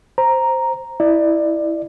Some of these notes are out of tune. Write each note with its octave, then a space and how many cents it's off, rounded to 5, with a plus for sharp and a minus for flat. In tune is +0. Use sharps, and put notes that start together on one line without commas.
C5 +0 A#5 +0
E4 -5 D5 +25